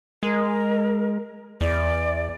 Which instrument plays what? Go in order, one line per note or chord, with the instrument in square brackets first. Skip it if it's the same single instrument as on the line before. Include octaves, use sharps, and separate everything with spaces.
[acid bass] G#3 [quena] A#4
[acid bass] E2 [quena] D5